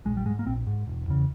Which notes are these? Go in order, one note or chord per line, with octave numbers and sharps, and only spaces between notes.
A#1 G#3
G3
G#2 G#3
A#3
A#1 C4
G#2
E1
E2 C#3